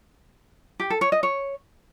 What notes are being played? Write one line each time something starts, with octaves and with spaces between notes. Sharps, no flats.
G4
A4
C#5
D#5
C#5